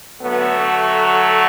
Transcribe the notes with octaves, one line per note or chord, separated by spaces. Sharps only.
D3 F#3 A3 B3